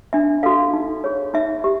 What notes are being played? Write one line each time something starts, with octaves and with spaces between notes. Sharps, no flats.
D4 E5
F#4 A4 F5
D#4
G#4 C#5
D#4 E5
G4